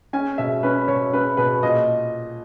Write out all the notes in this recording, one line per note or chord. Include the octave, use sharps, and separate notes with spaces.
C#4 G#5
B2 E5
C#4 B4
B2 C#5
C#4 B4
B2 B4
A#2 D#5